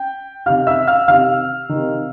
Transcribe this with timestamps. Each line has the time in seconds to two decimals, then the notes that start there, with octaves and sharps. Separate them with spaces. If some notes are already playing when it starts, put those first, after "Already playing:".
Already playing: G5 G6
0.46 C3 D#3 F5 F6
0.67 E5 E6
0.87 F5 F6
1.08 C3 D#3 F5 F6
1.69 C3 D#3